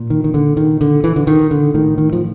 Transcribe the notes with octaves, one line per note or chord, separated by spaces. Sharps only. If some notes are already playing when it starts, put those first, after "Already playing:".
Already playing: A#2
D#3
D#3
D3
D#3
D3
E3
D3
D#3
D3
A2 D#3
D#3
F3